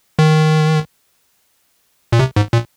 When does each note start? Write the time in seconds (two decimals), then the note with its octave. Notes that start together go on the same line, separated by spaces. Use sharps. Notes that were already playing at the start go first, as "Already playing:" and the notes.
0.19 D#3
2.12 A#2
2.19 C3
2.36 G#2
2.53 A#2